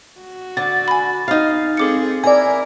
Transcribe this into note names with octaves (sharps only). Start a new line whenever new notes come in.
F#4
D3 A6
G#5 B5
D#4 F5
C4 G#4 A4 D6 C#7
E4 A#4 D5 G#5